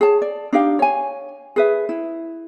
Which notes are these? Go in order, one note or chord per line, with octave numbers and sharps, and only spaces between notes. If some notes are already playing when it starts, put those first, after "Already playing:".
G#4 C#5 A5
D5
D4 D#4 G4 F5
C#5 G#5
G#4 B4 E5
E4